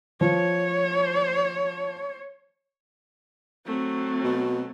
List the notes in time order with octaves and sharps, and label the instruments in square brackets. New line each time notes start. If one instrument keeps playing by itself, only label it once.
[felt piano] F3 [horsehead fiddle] C#5
[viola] F#3 A3 [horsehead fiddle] C4
[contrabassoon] B2